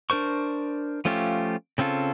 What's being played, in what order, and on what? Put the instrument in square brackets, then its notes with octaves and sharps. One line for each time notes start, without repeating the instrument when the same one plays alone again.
[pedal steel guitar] D4 A#4 C5 C#6
F3 A3 C#4 F4 G4
C#3 C4 C#4 F4 A4